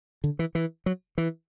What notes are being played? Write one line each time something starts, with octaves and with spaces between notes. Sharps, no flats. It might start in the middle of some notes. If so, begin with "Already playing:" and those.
D3
E3
E3
F#3
E3